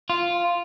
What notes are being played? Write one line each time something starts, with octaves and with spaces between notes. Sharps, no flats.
F4